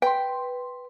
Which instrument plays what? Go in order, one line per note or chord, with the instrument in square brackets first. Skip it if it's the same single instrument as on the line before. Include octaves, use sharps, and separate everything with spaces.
[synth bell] B4 C6 [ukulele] G5